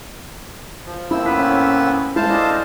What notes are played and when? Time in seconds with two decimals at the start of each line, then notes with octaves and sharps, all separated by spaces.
0.86 F3
1.11 A#3 C4 E4 E6
1.25 A2 B3 C#4 B4 B6
2.16 G#3 E4 C5 F5 A5
2.29 D4 A4 D#5 G#5